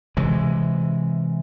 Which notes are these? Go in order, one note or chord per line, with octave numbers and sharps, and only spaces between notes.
C3 E3 G#3